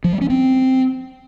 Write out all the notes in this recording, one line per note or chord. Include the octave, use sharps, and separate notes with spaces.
F3
G3
C#4
C4